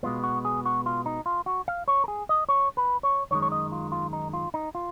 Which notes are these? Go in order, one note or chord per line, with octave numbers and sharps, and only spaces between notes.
B2 G#3 B3 F4
F#4
G#4
F#4
F4
D#4
F4
F#4
F5
C#5
A#4
G#4
D#5
C#5
B4
C#5
F#2 D#3 G#3 C#5
C#5
D#5
F4
F4
D#4
F4
D#4
F4